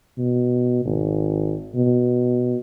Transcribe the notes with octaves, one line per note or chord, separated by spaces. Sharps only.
B2
G#1
B2